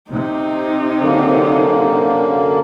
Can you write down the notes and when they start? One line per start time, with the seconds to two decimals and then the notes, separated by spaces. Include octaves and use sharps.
0.11 C3 C4 D#4
1.02 F#2 D3 A#3